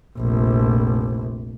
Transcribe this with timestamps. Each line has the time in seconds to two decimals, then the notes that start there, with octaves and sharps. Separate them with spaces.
0.17 F1 A#1